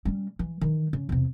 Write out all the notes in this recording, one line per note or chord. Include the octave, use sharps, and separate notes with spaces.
G3 C#4
E3
D#3 E3
C#3
E2 C3